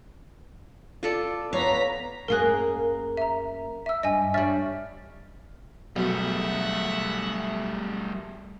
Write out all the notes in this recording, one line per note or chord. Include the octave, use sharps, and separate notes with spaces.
F4 A4 D5
B3 C#5 F5 A#5 B6
F#2 A#3 G#4 A#4 F#6
E5 A#5
E5 E6
G2 D#5 G#5
G3 C#5 E5 F6 A6
B1 G3 A3 E5 F#5